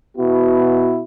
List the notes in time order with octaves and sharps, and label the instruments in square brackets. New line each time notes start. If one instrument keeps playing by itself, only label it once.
[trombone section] B2 B3 E4 F#4